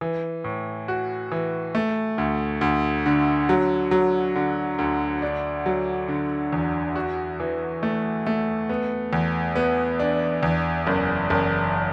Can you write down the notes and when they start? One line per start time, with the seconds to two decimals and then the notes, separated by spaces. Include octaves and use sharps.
0.01 E3
0.44 A2
0.88 F#4
1.31 E3
1.75 A3
2.18 D2
2.61 D2
3.06 D3
3.49 F#3
3.91 F#3
4.35 D3
4.78 D2
5.22 D4
5.66 F#3
6.08 D3
6.53 E2
6.96 F#4
7.40 E3
7.83 A3
8.27 A3
8.69 B3
9.13 E2
9.56 B3
9.99 D4
10.43 E2
10.87 F#1
11.30 F#1